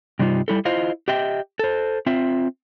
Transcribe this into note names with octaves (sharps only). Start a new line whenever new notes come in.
G2 C3 G3 D#4 F4
G3 E4 A4
E4 F4 C5 D#5 F5
G4 D#5 E5 G5
A4 C5
C4 F4 E5